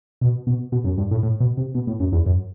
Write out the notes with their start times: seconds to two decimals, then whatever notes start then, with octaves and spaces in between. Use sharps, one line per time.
0.21 B2
0.47 B2
0.72 B2
0.84 F#2
0.98 G2
1.11 A2
1.23 A2
1.40 B2
1.57 C3
1.75 B2
1.87 A2
2.00 F#2
2.12 E2
2.26 F#2